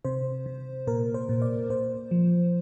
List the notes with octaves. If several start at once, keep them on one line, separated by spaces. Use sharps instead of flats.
C3 C5
C3
A#2 A#4
C5
A#2
D5
A#2 C5
F3